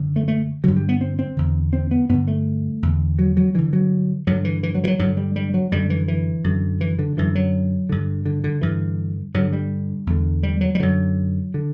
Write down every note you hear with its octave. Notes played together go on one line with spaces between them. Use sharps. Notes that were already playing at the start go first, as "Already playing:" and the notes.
Already playing: F#2 D3
A3
A3
G2 D3 F#3
G3
B3
C4
C4
E2 D3
C4
B3
G2 D3 B3
A3
E2 D3
F#3
F#3
G2 D3 E3
F#3
G2 D3 F#3
E3
E3
F#3
E3
F#3
G2 F#3
D3
G3
G3
F#3
F#2 D3 G3
E3
E3
F#2 D3
E3
D3
F#2 D3 E3
F#3
G2 D3
D3
D3
G2 D3 E3
G2 D3 F#3
G3
E2 D3
G3
F#3
G3
F#2 D3 F#3
D3